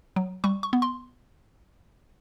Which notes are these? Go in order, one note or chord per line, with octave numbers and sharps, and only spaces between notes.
F#3
G3 C#6
C#6
B3
C6